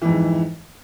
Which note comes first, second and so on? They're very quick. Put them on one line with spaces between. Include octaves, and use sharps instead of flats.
E3 F2 G#2